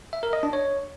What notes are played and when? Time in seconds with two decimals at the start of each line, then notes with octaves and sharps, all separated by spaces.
0.13 E5
0.23 A#4
0.33 D#5
0.43 D4
0.53 C#5